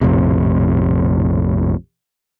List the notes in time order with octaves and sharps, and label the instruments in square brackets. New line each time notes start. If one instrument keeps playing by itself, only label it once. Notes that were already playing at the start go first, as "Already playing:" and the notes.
[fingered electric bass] A#1 F2 A2 C3